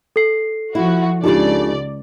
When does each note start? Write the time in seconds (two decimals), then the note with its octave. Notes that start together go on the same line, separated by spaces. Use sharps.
0.16 A4 C7
0.75 F3 E4 F#4
1.24 C#2 C#3 D4 D#4 F4 G4 A4 D5